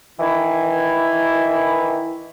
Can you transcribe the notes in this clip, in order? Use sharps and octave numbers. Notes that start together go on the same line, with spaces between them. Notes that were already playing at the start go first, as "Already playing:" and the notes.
D#3 E3 E4